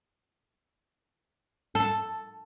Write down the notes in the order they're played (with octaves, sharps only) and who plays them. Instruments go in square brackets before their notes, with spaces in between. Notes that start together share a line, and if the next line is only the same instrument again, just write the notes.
[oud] A4